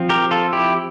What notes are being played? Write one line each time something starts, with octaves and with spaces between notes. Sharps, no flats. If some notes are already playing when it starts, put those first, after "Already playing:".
Already playing: F3 C4
G4 A#4
F4 A4
E4 G4